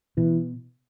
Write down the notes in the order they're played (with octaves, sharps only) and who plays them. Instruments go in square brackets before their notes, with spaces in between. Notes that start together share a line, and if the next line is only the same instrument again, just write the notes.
[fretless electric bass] B2 [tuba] E3